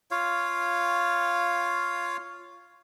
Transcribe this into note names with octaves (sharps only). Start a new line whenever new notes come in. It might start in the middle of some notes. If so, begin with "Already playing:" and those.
F4 C#5 F5